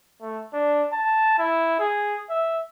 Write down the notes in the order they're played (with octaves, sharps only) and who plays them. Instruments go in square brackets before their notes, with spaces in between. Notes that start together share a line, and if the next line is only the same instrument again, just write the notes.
[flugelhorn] A3
D4
A5
E4
G#4
E5